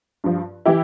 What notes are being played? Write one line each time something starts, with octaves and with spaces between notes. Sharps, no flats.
G2 F3
E3 E4 G4